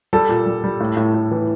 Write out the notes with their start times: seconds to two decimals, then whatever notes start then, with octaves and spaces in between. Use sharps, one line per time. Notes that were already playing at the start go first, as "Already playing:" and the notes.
0.13 G3 A4
0.29 A#2
0.46 G3
0.64 G3
0.80 A2
0.97 A2
1.14 A2
1.31 E3